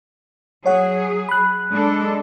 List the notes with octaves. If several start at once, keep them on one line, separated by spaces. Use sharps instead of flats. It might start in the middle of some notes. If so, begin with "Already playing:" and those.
F#3 G#4 C#5 F#5
B5 F#6
G#3 D4 A4